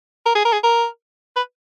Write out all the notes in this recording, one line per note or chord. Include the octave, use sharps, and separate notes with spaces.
A#4
G#4
A#4
G#4
A#4
B4